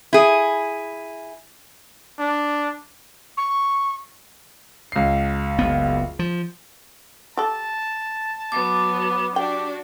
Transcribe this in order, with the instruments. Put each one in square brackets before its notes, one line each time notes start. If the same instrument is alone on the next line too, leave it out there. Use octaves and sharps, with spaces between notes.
[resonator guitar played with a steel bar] E4 G#4
[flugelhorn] D4
[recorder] C#6
[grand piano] C#2 C7
[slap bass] F#1 B3
F3
[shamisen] G4 A4 [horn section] A5
[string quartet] F#3 B3 [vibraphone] D6
[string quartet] D4 F#4 [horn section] G4 [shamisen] G5